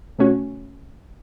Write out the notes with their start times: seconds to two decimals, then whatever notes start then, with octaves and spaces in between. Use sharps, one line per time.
0.19 C3 A3 C#4 F#4